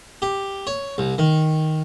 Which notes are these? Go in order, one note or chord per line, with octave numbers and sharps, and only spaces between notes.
G4
C#5
C2
D#3